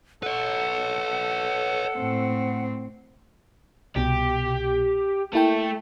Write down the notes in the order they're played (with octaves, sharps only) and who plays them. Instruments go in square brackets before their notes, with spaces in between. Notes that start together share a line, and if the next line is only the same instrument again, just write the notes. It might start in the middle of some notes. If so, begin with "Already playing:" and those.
[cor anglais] A4 [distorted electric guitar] B4 C#5 [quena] F#5
[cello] A2 C4
[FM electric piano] C2 B2 [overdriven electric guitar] G4
[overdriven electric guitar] A3 A4 [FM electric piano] A#3 E4 G5